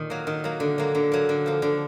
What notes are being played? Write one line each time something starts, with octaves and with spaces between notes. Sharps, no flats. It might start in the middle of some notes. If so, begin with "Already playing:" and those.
Already playing: A#2 D#3
F#3 A#3
D#3
F#3 A#3
D3
F#3 A#3
D3
F#3 A#3
D3
F3 A#3
D3